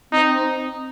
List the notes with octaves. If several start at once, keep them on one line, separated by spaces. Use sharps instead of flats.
C4 D#4